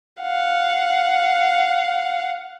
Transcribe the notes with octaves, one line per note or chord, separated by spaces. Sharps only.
F5 F#5